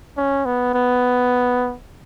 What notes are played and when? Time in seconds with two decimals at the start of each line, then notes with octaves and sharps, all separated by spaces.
0.17 C#4
0.45 B3
0.74 B3